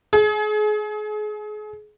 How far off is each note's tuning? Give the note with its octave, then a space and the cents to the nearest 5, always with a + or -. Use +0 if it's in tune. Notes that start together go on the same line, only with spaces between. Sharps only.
G#4 +30